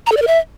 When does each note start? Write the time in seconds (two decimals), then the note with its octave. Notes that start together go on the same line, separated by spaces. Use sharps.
0.07 A#5
0.12 A4
0.17 D5
0.22 A#4
0.27 E5